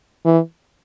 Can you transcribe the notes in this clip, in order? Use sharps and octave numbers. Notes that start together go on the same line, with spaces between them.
E3